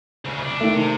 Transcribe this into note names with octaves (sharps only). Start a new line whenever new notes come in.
D2 C#3
C#2 D4
D#3 A3
C3